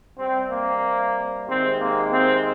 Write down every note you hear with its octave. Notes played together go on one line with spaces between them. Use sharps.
C3 G3 C4
A#3
C3 D#3 G#3 C4
A#3
C4